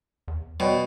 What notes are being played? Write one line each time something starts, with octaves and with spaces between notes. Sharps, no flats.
E2
B2 G3 C#5 D5 G5